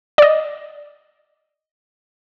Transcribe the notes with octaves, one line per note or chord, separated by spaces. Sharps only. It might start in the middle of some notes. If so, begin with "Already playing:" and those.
D5 D#5